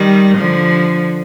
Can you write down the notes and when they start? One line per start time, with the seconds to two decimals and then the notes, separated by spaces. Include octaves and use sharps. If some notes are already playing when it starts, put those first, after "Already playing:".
Already playing: D#3 G3
0.38 D3 F3